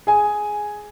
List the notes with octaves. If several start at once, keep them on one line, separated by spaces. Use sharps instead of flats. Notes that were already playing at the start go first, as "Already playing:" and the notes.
G#4 G#5